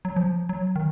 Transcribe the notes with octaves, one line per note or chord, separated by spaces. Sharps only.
F#3
F3
F#3
D#3